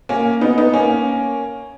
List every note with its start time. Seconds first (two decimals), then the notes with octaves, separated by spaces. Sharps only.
0.09 A#3 C#4
0.41 B3 D#4
0.58 B3 D#4
0.73 A#3 C#4